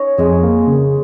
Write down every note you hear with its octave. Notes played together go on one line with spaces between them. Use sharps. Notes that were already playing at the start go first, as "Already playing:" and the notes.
Already playing: C#4 D#4 C#5 D#5
F2 G#3 G#4
A#3
C#3